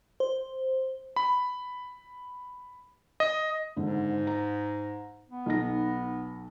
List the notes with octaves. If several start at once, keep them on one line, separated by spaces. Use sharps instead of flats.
C5
B5
D#5
G#1 G#2 D3
A#5
B3
B1 D#4 A#6